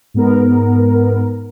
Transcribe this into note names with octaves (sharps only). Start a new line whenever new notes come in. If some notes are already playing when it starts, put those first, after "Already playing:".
G#2 B3 A#4